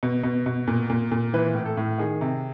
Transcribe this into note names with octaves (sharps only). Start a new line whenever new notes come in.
B2
B2
B2
A#2
A#2
A#2
E3 B4
A2
A4
A2
D#3 G#4
C3